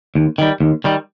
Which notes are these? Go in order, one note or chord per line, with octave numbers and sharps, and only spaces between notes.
D#2
D#3 G3
D#2
D#3 G3